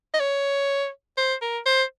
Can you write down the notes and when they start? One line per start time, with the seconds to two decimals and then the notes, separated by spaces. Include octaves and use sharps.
0.14 D#5
0.20 C#5
1.18 C5
1.42 A#4
1.66 C5